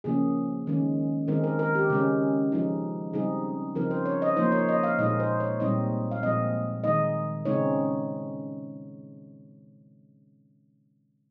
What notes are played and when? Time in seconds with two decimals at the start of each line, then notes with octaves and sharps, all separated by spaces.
0.04 C#3 F3 A#3 C#4 G#4
0.67 D#3 G#3 C#4
1.28 D#3 G#3 C4 D#4 A#4
1.44 A#4
1.59 A#4
1.75 G4
1.90 C#3 G#3 C#4
2.52 F3 G#3 D#4
3.13 C#3 G3 C4 D#4 G#4
3.75 C#3 F3 C4 D#4 A#4
3.91 C5
4.06 C#5
4.22 D#5
4.37 F3 A#3 D#4 C5
4.52 C#5
4.69 D#5
4.83 F5
4.98 A#2 G#3 D#4 D#5
5.20 C5
5.40 C#5
5.60 A#2 G3 C4 D#4 D#5
6.11 F5
6.23 A#2 F3 G#3 C4 D#5
6.84 D#3 G#3 D#4 D#5
7.45 C#3 G#3 C4 D#4 C#5